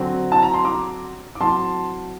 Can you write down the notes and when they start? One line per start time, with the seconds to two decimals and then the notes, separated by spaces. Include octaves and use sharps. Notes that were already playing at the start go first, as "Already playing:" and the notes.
Already playing: D3 F#3 C4
0.32 A5
0.43 A#5
0.54 C6
0.65 A#5 D6
1.35 D6
1.39 A2 F#3 C4 A5 C6